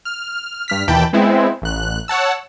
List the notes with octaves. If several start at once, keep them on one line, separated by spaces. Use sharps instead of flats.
F6
G2 F6 B6
D#2 B2 E3 G5 A5 B5
G#3 B3 C4 E4
A1 F#6
C#5 F#5 A5 E6